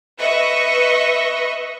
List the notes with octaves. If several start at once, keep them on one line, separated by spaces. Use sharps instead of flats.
B4 D#5 E5 C#6 F#6 A#6